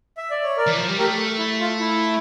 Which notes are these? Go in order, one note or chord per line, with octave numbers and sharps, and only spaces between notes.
E5
D5
C#5
A#4 D5
E3
F3
G3
A3 G4 A#4
E4
F4
E4